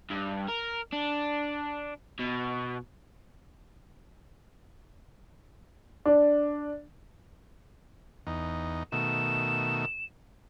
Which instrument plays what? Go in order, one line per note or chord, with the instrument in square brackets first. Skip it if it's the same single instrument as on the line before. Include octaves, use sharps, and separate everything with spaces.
[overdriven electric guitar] G2
A#4
D4
B2
[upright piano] D4
[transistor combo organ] E2 D#4
[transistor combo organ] B2 D#3 A3 [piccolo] E7